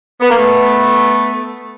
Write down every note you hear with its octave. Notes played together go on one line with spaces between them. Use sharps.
B3
A#3
A3 B3